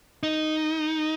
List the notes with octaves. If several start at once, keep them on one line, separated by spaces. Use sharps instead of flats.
D#4